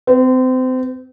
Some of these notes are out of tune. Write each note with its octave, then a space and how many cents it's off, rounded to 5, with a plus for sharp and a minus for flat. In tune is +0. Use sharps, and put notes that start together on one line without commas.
C4 -30